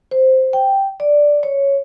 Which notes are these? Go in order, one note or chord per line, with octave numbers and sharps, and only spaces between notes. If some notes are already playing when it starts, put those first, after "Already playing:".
C5
G5
D5
C#5